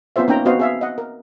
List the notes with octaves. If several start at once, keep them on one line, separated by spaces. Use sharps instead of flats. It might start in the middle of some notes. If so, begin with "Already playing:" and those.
B3 C4 F4 G#4 C5 E5
A#3 C#4 D#4 G5 A#5
B3 C4 F#4 C5 D#5 F5
G#4 E5 F5
D#5 F#5
A#4